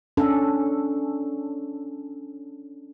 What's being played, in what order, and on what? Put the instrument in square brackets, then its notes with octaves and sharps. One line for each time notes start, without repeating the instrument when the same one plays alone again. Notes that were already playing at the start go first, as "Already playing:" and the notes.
[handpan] C#4 D4 A4